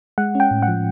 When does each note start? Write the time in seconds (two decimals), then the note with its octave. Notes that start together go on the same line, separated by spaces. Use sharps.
0.18 G#3 F#5
0.35 C#4 G5
0.51 A2
0.63 F#5
0.68 F3